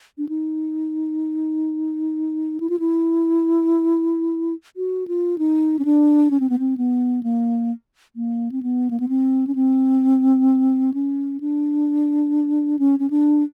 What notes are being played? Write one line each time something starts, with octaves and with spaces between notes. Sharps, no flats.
D4
D#4
E4
F4
E4
F#4
F4
D#4
C#4
D4
C#4
C4
B3
C4
B3
A#3
A#3
C4
B3
A#3
B3
C4
C#4
C4
C#4
D4
C#4
C#4
D4